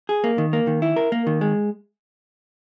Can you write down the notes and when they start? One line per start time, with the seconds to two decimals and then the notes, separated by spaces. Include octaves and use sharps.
0.09 G#4
0.24 A#3
0.38 D#3
0.53 A#3
0.67 D#3
0.82 E4
0.96 A#4
1.12 A#3
1.27 D#3
1.41 G#3